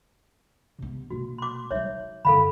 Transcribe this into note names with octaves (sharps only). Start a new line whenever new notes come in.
C3 B3
B2 A#3 F#4
C6 D6
F#3 D#4 C#5 E5
F#2 D3 A4 F5 B5